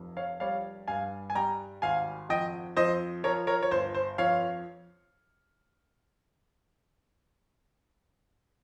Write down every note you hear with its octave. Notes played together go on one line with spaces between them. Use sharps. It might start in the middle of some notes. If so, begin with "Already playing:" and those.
Already playing: F1 F2
C#5 F5
G3 C#5 F5
G2 F5 G#5
G#5
G3 G5 A#5
G#1 F5 G#5
F2 D#5 G5
F2 C5 D#5
F3 A#4 C#5
A#4 C#5
C#5
G1 C5
C5
F2 C#5 F5